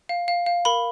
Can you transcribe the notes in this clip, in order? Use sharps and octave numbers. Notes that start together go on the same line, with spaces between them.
F5
F5
F5
A#4 B5